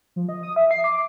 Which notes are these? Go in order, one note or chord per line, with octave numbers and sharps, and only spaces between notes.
F3
D#5
D#6
E5
C7
D6